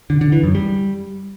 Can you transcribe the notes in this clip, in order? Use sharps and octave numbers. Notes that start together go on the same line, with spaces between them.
D3
D3
E3
F#2
G3